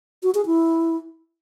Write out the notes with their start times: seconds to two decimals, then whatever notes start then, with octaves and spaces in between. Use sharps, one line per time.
0.23 F#4
0.35 G#4
0.46 E4